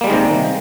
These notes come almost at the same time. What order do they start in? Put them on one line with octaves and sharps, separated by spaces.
A#3 G3 G#3 D#3 C3